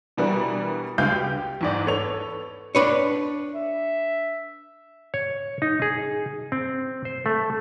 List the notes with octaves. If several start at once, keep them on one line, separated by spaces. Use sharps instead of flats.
B2 E3 G3 D4 F#4 A#4
C#2 G#3 D4 F#4 F5 G6
G4
E2 G#2 D5
B3 A4 C#5 F7
D4 B4 C#5
E5
C#5
D#4
G#4
C4
C5
A3